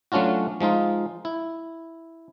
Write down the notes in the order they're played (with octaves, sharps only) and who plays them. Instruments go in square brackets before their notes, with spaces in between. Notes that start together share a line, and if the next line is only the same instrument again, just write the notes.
[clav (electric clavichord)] F#3 A3 C#4 D4 F4 F#4
F3 G#3 D#4 F4
E4